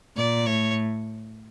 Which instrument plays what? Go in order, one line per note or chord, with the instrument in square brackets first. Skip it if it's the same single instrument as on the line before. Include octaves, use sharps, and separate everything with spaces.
[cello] A#2 [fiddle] D5
[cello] A2 [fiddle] C#5